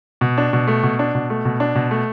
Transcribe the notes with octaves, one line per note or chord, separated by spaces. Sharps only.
B2
D4
B2
A3
B2
D4
B2
A3
B2
D4
B2
A3